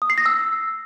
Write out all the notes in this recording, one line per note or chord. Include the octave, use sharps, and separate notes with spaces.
D#6
C7
A#6
E6